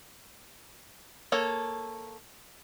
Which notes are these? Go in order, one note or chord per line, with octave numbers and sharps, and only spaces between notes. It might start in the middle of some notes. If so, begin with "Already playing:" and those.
A#3 A4 C#5